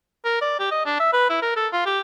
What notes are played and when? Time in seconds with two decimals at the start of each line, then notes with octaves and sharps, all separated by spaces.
0.25 A#4
0.41 D5
0.60 G4
0.71 D#5
0.86 D4
1.00 E5
1.13 B4
1.30 E4
1.42 A#4
1.56 A4
1.73 F4
1.86 G4